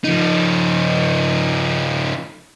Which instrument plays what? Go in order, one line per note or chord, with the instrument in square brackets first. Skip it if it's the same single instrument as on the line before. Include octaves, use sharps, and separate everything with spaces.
[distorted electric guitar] F3 D#4